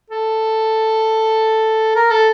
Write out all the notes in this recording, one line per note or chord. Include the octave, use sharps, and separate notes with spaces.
A4
A#4
A4